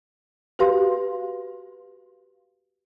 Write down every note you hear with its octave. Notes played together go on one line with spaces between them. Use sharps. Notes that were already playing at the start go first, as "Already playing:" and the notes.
F#4 G4 B4 F5 C6